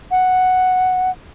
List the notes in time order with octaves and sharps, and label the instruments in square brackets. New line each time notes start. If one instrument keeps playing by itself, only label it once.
[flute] F#5